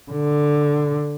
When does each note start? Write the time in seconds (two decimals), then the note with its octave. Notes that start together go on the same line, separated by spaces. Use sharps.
0.12 D3